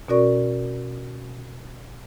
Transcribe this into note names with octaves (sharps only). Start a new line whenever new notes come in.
B2 C#4 F#4 A#4 D5 C#6